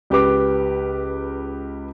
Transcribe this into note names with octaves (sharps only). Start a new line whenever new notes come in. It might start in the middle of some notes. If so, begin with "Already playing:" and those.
C#2 G4 B4 D6